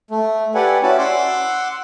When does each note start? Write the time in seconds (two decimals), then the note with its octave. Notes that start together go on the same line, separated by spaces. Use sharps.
0.11 A3
0.55 G4 A4 B4 D5 F#5 G#5
0.83 C#4 E4 F#4 D5 A5 B5
0.98 F#5 C6 D6 E6